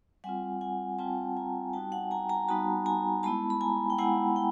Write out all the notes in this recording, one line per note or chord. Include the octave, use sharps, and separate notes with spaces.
G3 C4 F4 F#5 G#5
F#5 G#5
G3 C4 F4 G5 A5
G#5 A#5
G3 B3 D#4 F#4 G5 A5
F#5 G#5
G#5 A#5
G#5 A#5
G3 B3 D#4 F#4 A5 B5
G#5 A#5
G#3 B3 E4 A5 B5
B5
G#5 A#5
G5
G#3 B3 E4 F#5 G#5
G5